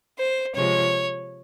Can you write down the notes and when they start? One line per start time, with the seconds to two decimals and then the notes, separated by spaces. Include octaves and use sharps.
0.19 C5
0.55 C3 F3 G#3 C#5